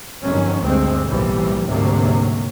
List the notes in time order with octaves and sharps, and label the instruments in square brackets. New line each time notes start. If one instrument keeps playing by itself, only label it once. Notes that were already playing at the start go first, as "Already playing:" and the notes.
[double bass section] G1 F2 D#3 F3 F#3 C#4
G1 D2 G2 G#3 C4
B1 A2 E3 F3 G3 A#3
D2 G#2 C3 F#3 A#3